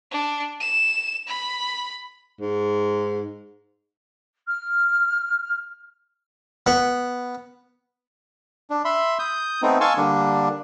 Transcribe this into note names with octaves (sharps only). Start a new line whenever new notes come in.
D4
E7
B5
G#2
F6
B3
D4
E5 B5 C6
D#6 G6
A3 B3 C4 D#4
F5 G#5 A5 C6 C#6 E6
D3 G3 A#3 D4